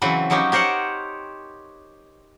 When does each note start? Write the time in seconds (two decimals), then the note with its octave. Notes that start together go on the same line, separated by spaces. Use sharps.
0.02 C#3 E3 F#3 C4 B4
0.30 F3 F#3 C#4 D#4 G4
0.52 G4 A#4 C5 C#5 F#5